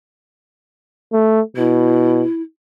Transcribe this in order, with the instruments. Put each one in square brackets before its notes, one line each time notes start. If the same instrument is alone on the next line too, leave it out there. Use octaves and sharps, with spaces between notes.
[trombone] A3
[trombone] B2 [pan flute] E4